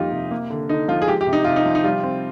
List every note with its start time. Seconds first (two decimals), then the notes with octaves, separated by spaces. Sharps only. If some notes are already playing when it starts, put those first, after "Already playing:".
Already playing: F2 G3 A#3 D#4 F4 G4
0.12 C3
0.31 A#3
0.50 D3
0.69 D3 D#4
0.88 F3 F4
1.02 G#4
1.08 G#3 G4
1.21 G4
1.26 C3
1.33 D#4
1.44 C3 F4
1.56 D#4
1.66 F3
1.75 D#4
1.84 G3 F4
2.03 C4